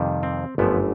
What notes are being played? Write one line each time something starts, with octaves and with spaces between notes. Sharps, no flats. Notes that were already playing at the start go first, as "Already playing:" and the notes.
Already playing: F2 C3 D#3 G3
C4
G1 F#2 D3 F3 A3 B3